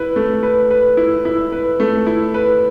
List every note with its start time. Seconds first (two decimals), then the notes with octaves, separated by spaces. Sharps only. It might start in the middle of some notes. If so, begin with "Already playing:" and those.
Already playing: E4 B4
0.16 A3
0.43 B4
0.71 B4
0.97 E4
1.25 E4
1.52 B4
1.80 A3
2.07 E4
2.34 B4